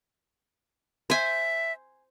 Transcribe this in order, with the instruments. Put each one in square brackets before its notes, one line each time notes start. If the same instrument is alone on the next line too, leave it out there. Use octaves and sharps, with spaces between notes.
[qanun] C5 G#5 [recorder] E5